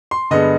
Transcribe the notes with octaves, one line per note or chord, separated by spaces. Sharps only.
C6
G2 D3 G#3 B3 D#5